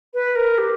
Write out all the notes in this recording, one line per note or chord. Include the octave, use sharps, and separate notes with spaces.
B4
A#4
G4